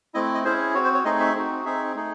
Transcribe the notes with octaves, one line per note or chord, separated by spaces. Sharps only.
A3 C4 E4 D#5
D#5
C#4 E4 G#4 C5
C4 F#4 C#5
C5
C#5
A3 C4 D#4 G#4 D#5
E5
C4 D#4 F#4
C4 D#4 G#4 E5
A3 D#4 G#4